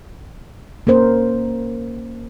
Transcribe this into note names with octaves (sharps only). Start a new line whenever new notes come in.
A#3 C#4 A#4 C5